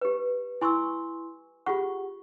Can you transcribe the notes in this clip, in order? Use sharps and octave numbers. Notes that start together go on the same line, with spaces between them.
G4 B4
E4 G#5 C6 C#6 E6
F4 G4 G#4 F#5 C#6